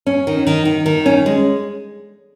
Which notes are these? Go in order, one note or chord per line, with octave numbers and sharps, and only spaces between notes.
C#4
D#3
D#3
D#3
D#3
C#4
G#3